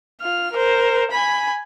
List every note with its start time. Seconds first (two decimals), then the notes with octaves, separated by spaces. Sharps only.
0.22 F4 F6
0.53 A#4 C5
1.11 G#5 B5